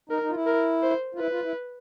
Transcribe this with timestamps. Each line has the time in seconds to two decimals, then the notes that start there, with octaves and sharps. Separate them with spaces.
0.10 D#4 A#4
0.22 D#4
0.30 F4
0.34 E4
0.46 A#4
0.83 C5
1.15 F4
1.19 E4 B4
1.32 F4
1.44 E4